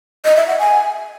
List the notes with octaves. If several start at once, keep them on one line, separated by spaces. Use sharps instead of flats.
D#5
E5
F#5
G#5